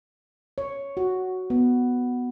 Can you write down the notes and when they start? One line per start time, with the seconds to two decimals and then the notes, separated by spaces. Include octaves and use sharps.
0.58 C#5
0.97 F#4
1.50 B3